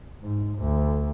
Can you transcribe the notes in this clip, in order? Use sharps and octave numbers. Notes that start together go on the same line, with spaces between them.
G#2
D2